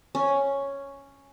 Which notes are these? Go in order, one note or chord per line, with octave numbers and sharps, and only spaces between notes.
C#4